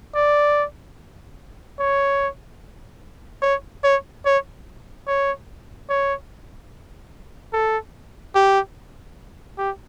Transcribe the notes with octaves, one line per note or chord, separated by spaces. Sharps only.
D5
C#5
C#5
C#5
C#5
C#5
C#5
A4
G4
G4